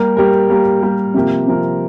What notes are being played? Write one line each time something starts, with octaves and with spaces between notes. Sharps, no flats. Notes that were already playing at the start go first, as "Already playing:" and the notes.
Already playing: G3 A#3 G4 A#4
G3 A#3 G4 A#4
G3 A#3 G4 A#4
G3 A#3 G4 A#4
C3 F3 A#3 G4 A#4
C3 F3 A#3 G4 A#4